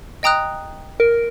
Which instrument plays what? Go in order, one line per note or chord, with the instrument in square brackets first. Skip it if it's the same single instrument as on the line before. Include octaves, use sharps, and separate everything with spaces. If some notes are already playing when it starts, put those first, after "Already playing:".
[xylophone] D#5 G5 A#5 D#6 F#6
[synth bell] A#4